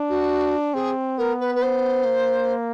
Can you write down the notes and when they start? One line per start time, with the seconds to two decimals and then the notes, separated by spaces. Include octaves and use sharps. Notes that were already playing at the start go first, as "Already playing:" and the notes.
Already playing: D4
0.09 F#4
0.74 C4 G#4
1.18 B3 A#4
1.40 B4
1.55 B4
1.62 C5
2.05 A#3